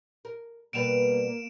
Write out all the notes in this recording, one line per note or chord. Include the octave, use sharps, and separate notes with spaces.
A#4
B2 G3 A#3 B4 D7 E7 F7